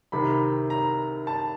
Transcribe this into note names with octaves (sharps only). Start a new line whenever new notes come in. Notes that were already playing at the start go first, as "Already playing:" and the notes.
C2 C3 D#3 B5
A#5
A5